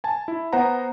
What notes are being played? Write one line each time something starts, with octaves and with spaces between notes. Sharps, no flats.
G#5 A5
E4
B3 C5 F#5 A#5